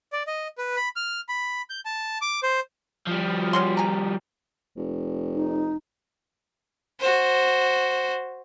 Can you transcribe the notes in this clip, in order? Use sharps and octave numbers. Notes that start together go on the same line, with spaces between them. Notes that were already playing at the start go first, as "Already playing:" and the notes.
D5
D#5
B4
B5
F6
B5
G6
A5
D6
C5
F3 G3
C#4 F#4 C6
G#5 A#5
F1
D#4
F#4 C5